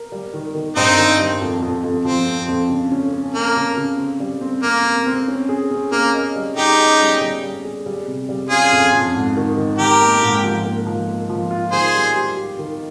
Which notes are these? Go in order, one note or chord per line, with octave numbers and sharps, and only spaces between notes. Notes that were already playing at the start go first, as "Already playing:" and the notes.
Already playing: A#4
G3
D#3
D#3
G2 C4 D#4
D#3
G3
F2
F2
F2
F3 C4
F2
F2
C#3
C#4
C#4
A#3 C#4
C#3
C#3
C4
G3
C4
A#3 C4
C4
C4
C#4
G#4
C#4
A#3 C#4
D#5
G3
D#4 G4 G#4
C#4
G3
G3
G3
G#4
G3
C3
G3
C#4 F4 G#4
F2
F2
G#2
D#3
D#3
D#3 G4 A#4
A#3
G#2
F3
A#3
F3
A#3
F3
F4
D#3 G#4 C5
G3
G4
G4
D#3